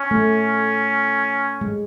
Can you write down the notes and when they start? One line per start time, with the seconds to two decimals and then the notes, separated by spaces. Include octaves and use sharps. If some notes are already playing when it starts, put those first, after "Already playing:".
Already playing: C#4
0.11 A3
1.61 G#3